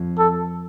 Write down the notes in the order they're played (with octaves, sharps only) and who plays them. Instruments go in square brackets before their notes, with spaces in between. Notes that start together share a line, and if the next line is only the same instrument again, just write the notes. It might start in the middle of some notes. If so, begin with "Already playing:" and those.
Already playing: [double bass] F2
[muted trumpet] A4